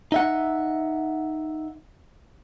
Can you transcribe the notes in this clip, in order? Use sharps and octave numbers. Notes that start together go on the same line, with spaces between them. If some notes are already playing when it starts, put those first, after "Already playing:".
D#4 E5 F#5